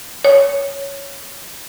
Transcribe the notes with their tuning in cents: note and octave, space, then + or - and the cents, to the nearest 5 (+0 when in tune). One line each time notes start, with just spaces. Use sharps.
C#5 +10